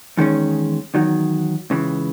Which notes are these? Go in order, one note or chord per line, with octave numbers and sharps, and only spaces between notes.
E2 D#3 G#3 C#4
E2 D#3 F#3
C#2 C#3 E3